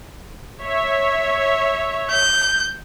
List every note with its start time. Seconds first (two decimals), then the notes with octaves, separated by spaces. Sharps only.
0.61 C#5 E5
2.11 G6